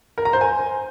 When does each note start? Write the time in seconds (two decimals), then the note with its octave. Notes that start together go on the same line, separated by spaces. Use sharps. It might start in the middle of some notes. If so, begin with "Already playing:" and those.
0.18 A#4
0.25 A#5
0.33 C5
0.41 G#5